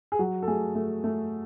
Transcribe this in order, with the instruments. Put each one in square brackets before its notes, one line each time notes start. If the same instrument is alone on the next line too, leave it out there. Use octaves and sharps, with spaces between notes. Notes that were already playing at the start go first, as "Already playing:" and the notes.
[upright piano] G#4
F#3 F#4
A4
A3 G#4
A3
A3